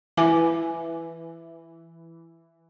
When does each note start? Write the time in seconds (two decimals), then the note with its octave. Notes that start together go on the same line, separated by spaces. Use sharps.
0.17 E3 G#5 D6